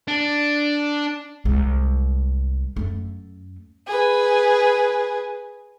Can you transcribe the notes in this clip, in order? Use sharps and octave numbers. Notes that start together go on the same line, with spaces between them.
D4
C2 G#3
F#2 A3
G#4 B4